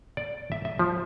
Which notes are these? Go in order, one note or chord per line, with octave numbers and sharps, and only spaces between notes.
D5
E5
E5
F3